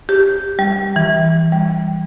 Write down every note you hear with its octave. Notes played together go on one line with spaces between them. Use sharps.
G4
G3
E3
G3